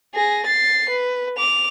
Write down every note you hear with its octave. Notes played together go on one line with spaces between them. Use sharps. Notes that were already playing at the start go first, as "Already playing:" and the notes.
G#4 A#6
A6 C7
B4
D6 F7